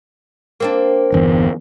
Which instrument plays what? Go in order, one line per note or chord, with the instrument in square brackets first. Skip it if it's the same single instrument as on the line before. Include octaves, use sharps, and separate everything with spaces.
[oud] A#3 C4 D4
[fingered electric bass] G1 E2